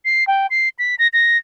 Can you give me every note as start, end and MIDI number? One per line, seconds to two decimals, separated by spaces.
0.05 0.27 96
0.27 0.47 79
0.50 0.69 96
0.79 0.95 95
0.99 1.08 94
1.13 1.37 94